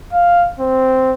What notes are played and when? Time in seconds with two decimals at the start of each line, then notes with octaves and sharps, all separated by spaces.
0.13 F5
0.59 C4